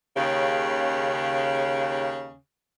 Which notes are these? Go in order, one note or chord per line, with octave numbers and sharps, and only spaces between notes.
D#2 C#3